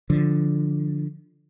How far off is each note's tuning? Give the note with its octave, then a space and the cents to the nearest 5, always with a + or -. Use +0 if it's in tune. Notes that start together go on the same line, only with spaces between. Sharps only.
D3 +0 F3 +0